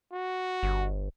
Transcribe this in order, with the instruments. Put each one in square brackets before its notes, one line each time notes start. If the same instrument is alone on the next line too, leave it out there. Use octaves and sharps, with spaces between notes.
[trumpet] F#4
[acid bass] G1